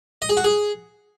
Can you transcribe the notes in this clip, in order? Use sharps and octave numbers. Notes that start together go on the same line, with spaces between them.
D#5
G#4
F#4
G#4